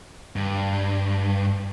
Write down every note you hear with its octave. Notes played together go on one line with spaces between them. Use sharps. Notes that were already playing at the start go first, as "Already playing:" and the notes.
G2